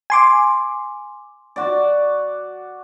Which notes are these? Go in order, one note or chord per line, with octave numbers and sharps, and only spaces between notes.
G#5 C6 D6
F#4 D5